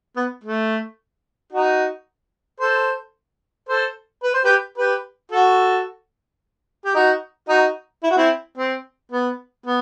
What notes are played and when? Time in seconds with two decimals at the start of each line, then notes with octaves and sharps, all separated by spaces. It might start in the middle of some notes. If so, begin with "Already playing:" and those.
0.16 B3
0.44 A3
1.52 D#4 F#4
2.60 A4 C5
3.69 A4 C5
4.23 B4
4.34 C5
4.44 G4 B4
4.78 G4 B4
5.32 F#4 A4
6.85 G4
6.95 D#4 F#4
7.49 D#4 F#4
8.03 E4
8.10 F#4
8.17 C4 E4
8.58 C4
9.12 B3
9.66 B3